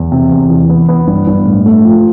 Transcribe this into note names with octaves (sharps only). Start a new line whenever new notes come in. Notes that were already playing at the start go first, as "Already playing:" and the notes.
Already playing: E2
C3
E2
E3
B3
B3
G2
G2
A2
A3
F3